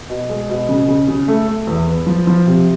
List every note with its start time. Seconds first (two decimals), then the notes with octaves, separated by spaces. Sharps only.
0.10 B2
0.29 G#3
0.49 B2
0.69 C#3
0.88 C#3
1.08 C#3
1.28 A3
1.48 A3
1.67 E2
1.87 B3
2.07 F3
2.27 F3
2.47 C3